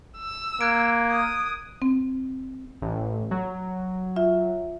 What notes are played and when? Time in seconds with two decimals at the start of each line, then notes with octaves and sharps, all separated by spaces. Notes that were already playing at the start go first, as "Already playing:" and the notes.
0.18 E6
0.61 A#3 F#6 G#6 D7
1.11 D#6
1.82 C4
2.82 A1
3.31 F#3
4.16 F4 E5